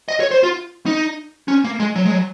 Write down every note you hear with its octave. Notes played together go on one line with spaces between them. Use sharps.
D#5
C#5
C5
F4
D#4
C#4
A#3
G#3
F#3
G#3
F#3